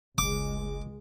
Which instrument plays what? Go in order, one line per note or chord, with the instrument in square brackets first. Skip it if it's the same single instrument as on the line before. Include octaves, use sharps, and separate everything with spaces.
[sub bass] F#1 [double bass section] C#2 G#3 [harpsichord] D6